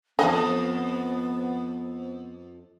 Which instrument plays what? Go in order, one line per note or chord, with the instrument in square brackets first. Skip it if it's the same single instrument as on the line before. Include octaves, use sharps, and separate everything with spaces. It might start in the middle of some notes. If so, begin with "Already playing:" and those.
[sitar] F2 A2 D#5 [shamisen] D3 [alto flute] B3